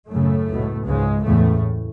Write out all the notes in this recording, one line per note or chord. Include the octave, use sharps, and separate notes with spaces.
F#2 A2 C#3 A3
C#2 B2
C#2 G#2 C#3 G#3
E2 A2 C#3 A3